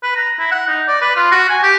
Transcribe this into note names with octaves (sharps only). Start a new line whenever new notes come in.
B4
A#5
E4
F#5
D#4
D5
B4
F4
F#4
G#5
G4